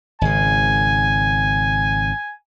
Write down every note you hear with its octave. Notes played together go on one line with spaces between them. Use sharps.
G#1 C#3 G#5